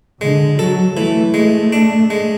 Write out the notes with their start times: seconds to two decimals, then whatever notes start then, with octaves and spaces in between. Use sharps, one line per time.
0.21 D3 G#3
0.58 F#3 A4
0.96 E3 A3
1.34 G#3 A3
1.73 D4
2.10 G#3